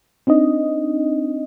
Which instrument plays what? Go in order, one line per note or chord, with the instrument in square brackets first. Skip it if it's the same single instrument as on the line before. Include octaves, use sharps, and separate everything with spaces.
[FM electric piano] C4 D4 D#4 D#5